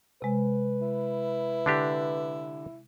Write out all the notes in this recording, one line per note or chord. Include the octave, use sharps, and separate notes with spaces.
C3 G#3 B4
E4
D3 D4 G4